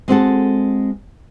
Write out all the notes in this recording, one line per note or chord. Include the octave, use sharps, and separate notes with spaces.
G#3 C4 F#4 A4